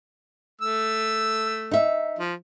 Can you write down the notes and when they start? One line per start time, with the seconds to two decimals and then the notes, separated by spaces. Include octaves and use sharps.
0.61 A3 E6
1.71 D#4 E5
2.19 F3